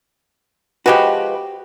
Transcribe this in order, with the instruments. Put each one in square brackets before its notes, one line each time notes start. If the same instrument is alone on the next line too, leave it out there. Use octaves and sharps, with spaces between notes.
[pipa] F3 G#3 B4 [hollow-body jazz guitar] F#4 G4